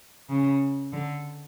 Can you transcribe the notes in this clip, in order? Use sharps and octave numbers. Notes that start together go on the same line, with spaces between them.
C#3
D3